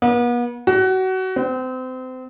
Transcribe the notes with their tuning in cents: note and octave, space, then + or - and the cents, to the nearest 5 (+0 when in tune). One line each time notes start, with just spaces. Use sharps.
B3 -40
F#4 +25
C4 -30